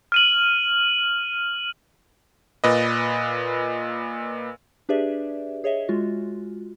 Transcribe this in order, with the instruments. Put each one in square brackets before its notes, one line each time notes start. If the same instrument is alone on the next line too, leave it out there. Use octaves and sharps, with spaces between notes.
[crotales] F6 D#7 F#7
[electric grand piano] A#2 B4 D#5
[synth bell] D4 G4 G#4 B4 D5 E5
G#4 C#5 D#5 E5
G#3 F4 F#4